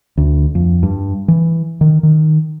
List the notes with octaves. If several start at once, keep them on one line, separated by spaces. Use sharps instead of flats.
D2
F2
G2
E3
D#3
D#3